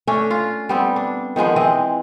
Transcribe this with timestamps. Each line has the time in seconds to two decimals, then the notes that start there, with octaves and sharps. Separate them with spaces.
0.07 A3 C#4 D4
0.31 F4
0.69 G3 B3 C4
0.96 D4
1.36 D#3 F3 G#3 B3
1.56 E3 G#3 C4 D#5